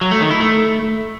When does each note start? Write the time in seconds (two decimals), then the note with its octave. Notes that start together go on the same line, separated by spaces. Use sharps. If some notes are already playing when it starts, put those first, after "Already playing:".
0.01 F#3
0.11 A3
0.21 D#3
0.31 E4
0.40 A3